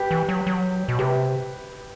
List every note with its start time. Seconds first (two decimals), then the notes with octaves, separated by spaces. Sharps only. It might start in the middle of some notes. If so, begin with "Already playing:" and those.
Already playing: G4 B4
0.11 E3
0.29 F#3
0.47 F#3
0.88 B2
0.99 C3 G4 B4